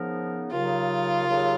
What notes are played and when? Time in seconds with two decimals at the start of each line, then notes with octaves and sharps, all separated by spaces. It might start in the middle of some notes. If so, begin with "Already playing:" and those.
Already playing: C#3 F3 B3 D#4 A#4
0.51 D#2 C#3 F#3 F4
1.26 D#2 C#3 F#3